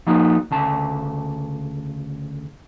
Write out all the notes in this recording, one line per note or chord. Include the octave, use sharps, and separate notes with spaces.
F3 A#3 D#4 F#4
D2 C#3 A5